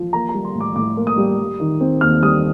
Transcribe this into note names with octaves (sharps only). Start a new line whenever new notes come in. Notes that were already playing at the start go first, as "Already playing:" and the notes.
Already playing: F3
A#3 A#5
A#5
G3
C6
A2
D6
A2 D6
A#3
D#6
G3
G3
D#3
C4
D#2 F6
G3 D#6